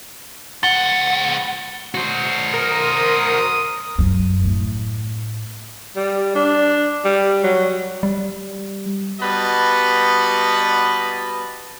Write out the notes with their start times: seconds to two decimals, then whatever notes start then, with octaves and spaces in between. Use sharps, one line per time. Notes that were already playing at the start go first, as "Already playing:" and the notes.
0.63 C#2 F#5 A6 C#7 G7
1.95 F#4 C5
2.54 A#4 D#6
3.98 F#2
4.44 A2
5.96 G3
6.35 D4
7.05 G3
7.43 F#3
8.03 G3
9.20 G3 B3 F#4 B4 D#5 A5